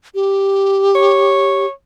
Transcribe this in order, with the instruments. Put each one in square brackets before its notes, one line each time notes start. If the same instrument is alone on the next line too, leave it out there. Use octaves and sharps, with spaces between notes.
[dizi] G4
[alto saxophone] C#5